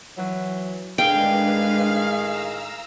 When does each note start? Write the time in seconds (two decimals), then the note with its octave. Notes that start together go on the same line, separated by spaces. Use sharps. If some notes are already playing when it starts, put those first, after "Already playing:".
0.17 E3 F#3
0.98 A2 D#3 G#3 D4 G#4 B4 F5 G5
2.19 A#5 E6